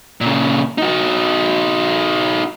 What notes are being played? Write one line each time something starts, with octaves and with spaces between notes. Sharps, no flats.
A#2 C#3
D#4 F#4